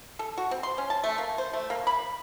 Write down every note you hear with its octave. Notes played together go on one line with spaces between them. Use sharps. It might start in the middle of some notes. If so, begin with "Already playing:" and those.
A4
F#4
C4
C6
C#4
A5
A3
A#3
C5
A3
A#3
B5